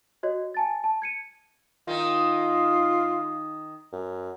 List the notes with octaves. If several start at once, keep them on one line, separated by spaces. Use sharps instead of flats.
F#4 C#5 D#5
G#5 A5 A6
A5
G#6 C#7 D#7
D#3 D#4 F4
F#2